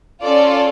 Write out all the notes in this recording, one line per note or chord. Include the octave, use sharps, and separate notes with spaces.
C#4 F4 A4 D5